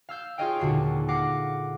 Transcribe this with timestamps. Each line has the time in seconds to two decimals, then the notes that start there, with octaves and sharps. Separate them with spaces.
0.09 F5 E6 G6
0.38 F4 G#4 C#5 D#5 F5 G5
0.60 D#2 A#2 D3 F#4 C7
1.08 F5 F#5 D6 A#6 C7